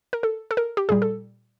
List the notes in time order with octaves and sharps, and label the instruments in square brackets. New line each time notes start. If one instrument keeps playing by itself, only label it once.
[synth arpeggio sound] A#4
A4
A4
A#4
G4
A#2 G3 G#4
A4